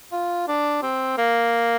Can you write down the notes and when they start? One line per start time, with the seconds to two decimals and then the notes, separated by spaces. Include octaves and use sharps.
0.12 F4
0.48 D4
0.82 C4
1.18 A#3